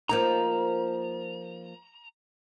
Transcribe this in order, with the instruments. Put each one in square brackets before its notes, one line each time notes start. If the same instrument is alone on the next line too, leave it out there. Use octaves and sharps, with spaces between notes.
[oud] F3 A#3 D#4 [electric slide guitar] A#5